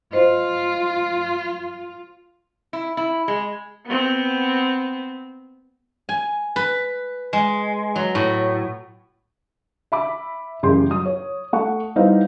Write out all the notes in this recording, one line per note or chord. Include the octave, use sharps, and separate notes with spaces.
F4 C5 D#5
E4
E4
G#3
B3 C4
G#5
B4
G#3
F#3
A2
E5 B5 D6
A1 F#2 C#3 G4 G#4 C6
F#3 D#6
C#5
A3 F#5 C#6
G3 B3 D#4 E4 C5 F5